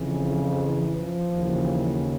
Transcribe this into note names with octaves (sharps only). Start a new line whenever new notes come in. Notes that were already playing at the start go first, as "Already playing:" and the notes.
Already playing: F2 C#3 E3
F3
E3
F3
D#2 C#3 E3